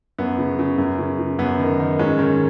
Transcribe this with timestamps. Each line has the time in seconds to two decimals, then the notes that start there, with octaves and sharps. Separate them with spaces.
0.18 F#2 B3
0.38 C#3
0.59 C#3
0.78 F#2
0.99 C#3
1.19 C#3
1.39 F#2 B3
1.59 D#3
1.80 D#3
1.99 G#2 C#4
2.19 D#3